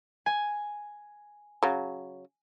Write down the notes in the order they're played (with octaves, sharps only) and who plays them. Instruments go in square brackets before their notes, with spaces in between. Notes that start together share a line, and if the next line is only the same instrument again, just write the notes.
[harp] G#5
[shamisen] C#3 F#3